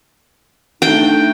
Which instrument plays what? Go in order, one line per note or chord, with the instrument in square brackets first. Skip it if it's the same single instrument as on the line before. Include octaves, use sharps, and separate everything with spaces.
[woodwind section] A3 D4 D#4 [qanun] G5